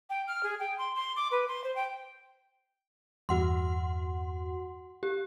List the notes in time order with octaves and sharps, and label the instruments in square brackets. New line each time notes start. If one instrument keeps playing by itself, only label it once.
[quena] G5
F6
G#4
G5
C6
C6
D6
B4
C6
C5
G5
[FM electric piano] E2 G2 [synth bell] F#4 F#5 C6
[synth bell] G4